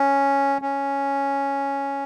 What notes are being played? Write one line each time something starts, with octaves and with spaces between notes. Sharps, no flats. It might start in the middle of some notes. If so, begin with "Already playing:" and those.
Already playing: C#4
C#4